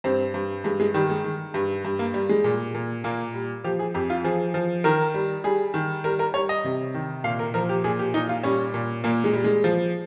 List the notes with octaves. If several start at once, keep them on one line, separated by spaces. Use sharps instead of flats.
G2 C4
G2
G2 G#3
G#3
D#3 G3
G#3
D#3
G2
G2
A#3
G3
G#3
A#2
A#2
A#2 A#3
G3
F3 G4
G#4
F2 G4
F4
F3 G#4
F3
D#3 A#4
G3
G3 G#4
D#3
G3 A#4
A#4
G3 C#5
D#5
C3
D#3
A#2 F5
A#4
F3 A#4
G4
A#2 G#4
G4
A#2 D#4
F4
G3 C#4
A#2
A#2 A#3
G#3
G3
G#3
F3